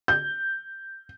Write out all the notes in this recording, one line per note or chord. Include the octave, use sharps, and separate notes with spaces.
G6